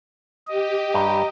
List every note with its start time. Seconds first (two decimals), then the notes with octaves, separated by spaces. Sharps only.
0.48 G4 D#5
0.94 G2 A#5